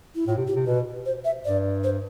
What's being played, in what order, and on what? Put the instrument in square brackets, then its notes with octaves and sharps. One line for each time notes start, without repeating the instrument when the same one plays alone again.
[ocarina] E4
[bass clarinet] A2 [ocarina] F4
[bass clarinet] C3
[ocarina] G4
[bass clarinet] C3
[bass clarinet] B2 [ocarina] B4
[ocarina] C5
E5
[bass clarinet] G2 [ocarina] D5
[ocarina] C5